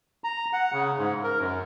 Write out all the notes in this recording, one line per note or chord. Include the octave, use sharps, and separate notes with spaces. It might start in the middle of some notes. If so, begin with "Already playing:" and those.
A#5
F#5
C#3
G#2
A#4
F#2